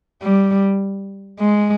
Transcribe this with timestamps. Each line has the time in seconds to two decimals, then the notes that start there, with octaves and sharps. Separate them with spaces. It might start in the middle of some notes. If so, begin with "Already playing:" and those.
0.23 G3
1.40 G#3